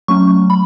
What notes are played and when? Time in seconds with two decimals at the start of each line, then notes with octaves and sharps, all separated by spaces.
0.08 F#3 A3 C#4 C#6
0.50 B5